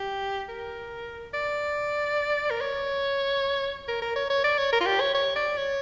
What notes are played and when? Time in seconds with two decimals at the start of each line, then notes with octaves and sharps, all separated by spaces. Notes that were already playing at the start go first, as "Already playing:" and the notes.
Already playing: G4
0.49 A#4
1.34 D5
2.50 A#4
2.61 C#5
3.88 A#4
4.02 A#4
4.16 C#5
4.30 C#5
4.44 D5
4.58 C#5
4.72 A#4
4.81 F4
4.86 G4
5.00 C#5
5.15 C#5
5.36 D5
5.57 C#5